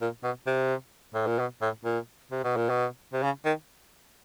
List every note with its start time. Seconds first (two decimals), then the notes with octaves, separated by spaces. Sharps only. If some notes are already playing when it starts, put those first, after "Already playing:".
0.02 A#2
0.24 B2
0.47 C3
1.14 A2
1.27 A#2
1.39 B2
1.62 A2
1.85 A#2
2.31 C3
2.44 B2
2.57 A#2
2.70 B2
3.13 C3
3.23 C#3
3.45 D#3